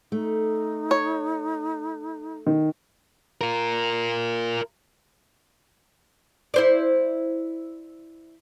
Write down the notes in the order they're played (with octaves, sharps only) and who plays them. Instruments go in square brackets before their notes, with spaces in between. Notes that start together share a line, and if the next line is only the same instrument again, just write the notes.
[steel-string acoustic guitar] A3 [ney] D#4
[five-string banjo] C#5
[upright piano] D#3
[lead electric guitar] F4 A#4
[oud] E4 C5 D5